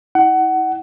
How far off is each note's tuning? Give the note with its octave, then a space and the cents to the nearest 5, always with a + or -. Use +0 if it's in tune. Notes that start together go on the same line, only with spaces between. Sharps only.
E4 -35 F#5 +20